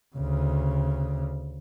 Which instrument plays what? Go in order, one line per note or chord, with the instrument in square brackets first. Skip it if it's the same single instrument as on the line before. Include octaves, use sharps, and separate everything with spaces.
[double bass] D2 C#3